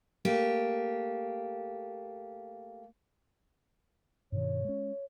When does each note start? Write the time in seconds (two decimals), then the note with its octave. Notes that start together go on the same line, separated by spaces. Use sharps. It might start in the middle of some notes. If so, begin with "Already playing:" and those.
0.25 A3 A#3 G4
4.32 G2 B2 D#3 C#5
4.65 G#3 C#4